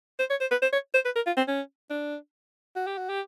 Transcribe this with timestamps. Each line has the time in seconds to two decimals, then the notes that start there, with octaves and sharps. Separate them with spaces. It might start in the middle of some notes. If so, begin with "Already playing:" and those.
0.19 C5
0.30 C#5
0.41 C5
0.51 B4
0.62 C5
0.73 C#5
0.94 C5
1.05 B4
1.16 A#4
1.27 F4
1.37 C4
1.48 C#4
1.90 D4
2.76 F#4
2.87 G4
2.98 F#4
3.09 G4